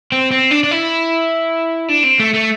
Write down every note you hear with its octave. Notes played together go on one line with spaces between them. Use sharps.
C4
C4
D4
D4
E4
D4
C4
A3
A3